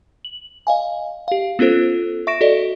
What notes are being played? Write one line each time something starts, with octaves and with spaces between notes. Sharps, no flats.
F#7
D#5 F5 G#5
G4 F5
B3 C#4 F4 A4 C5
E5 C#6 A#6 D7 E7
F#4 A4 D5 D#5